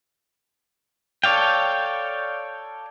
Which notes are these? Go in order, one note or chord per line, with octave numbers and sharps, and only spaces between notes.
A4 C#5 D5 F5 G5